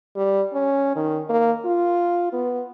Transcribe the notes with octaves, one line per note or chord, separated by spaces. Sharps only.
G3
C#4
D#3
A#3
F4
B3